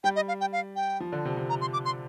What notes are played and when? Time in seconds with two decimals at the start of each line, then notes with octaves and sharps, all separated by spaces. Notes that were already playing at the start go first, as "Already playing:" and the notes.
0.04 G3 G5
0.16 D#5
0.28 F5
0.41 G5
0.53 F5
0.76 G5
1.00 F3
1.12 D3
1.25 C3
1.37 C3
1.50 A#5
1.61 C6
1.73 D6
1.85 C6